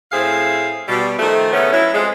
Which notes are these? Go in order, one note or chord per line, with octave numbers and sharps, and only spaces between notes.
A2 C4 G#4 E5 F5
B2 G3
D#3 F3 A3
C#3 A3 B3 C#4
F#3 C#4 E4
F2 G#3